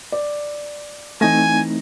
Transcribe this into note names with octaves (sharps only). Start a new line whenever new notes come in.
D5
E3 A3 C4 D#4 E4 G#5 A#6